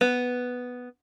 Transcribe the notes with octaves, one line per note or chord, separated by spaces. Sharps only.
B3